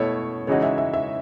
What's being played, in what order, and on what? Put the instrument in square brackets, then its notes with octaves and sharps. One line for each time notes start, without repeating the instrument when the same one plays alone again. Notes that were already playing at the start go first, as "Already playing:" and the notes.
Already playing: [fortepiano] B2 A3 E4 [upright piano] C#5
[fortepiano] C#3 E3 G#3 D#4 F#4 [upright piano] C#5
[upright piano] E5
E5
E5